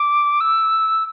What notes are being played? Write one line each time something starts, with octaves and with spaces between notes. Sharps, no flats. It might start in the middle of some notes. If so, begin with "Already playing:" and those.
Already playing: D6
E6